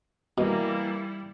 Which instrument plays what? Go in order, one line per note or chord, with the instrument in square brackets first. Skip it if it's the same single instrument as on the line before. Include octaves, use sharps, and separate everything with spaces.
[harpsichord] B2 [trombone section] E3 A#3 [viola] G3 E4